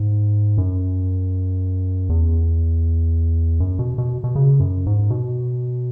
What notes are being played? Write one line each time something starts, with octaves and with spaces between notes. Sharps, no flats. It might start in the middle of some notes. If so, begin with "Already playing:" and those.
Already playing: G#2
F#2
E2
F#2
B2
B2
B2
C#3
F#2
G#2
B2